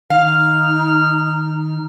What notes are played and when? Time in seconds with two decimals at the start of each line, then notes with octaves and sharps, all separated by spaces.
0.10 D#3 D#4 F5 F6